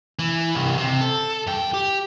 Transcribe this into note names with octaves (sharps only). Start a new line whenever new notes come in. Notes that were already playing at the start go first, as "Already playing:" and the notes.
E3
C2 G2
C3
A4
G2 G5
G4